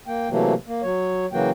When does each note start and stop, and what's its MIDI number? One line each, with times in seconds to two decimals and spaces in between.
0.07 0.29 58
0.07 0.29 79
0.30 0.54 48
0.30 0.54 52
0.30 0.54 54
0.30 0.54 57
0.30 0.54 58
0.67 0.82 58
0.83 1.26 54
0.83 1.26 73
1.32 1.50 49
1.32 1.50 52
1.32 1.50 54
1.32 1.50 58
1.32 1.50 66
1.32 1.50 79